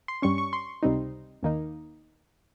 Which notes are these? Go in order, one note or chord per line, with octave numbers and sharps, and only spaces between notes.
C6
G2 G3 C#4 C#6
C#6
C6
C#2 C3 G3 C4 D#4
D#2 D#3 A#3 D#4